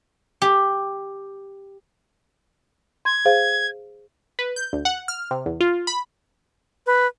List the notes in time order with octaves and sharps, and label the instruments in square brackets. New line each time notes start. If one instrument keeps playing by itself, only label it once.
[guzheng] G4
[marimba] C6 [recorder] G#6
[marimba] G#4 C5 F5
[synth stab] B4
G6
D2
F#5
F6
C3
E2
F4
B5
[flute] B4